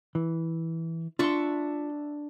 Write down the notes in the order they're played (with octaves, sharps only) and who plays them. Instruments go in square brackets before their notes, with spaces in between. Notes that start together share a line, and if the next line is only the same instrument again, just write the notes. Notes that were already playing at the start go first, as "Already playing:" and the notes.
[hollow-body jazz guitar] E3
[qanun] D4 E5 C#6 [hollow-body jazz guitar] F4 C6